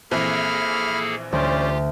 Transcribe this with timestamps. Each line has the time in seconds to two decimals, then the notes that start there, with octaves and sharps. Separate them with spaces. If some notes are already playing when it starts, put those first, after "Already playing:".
0.11 A#1 E3 A#3 C4 G#4 A4 B5 F6
1.32 D2 C#4 F4 G4 C5 D5